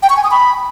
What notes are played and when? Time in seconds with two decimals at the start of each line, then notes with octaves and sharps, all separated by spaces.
0.03 G5
0.10 C#6
0.17 G#5
0.24 D#6
0.31 B5